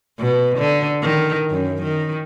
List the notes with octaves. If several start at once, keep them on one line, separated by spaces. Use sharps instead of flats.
B2
D3
D#3
F#2
D#3